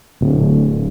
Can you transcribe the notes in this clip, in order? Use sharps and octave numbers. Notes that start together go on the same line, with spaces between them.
D1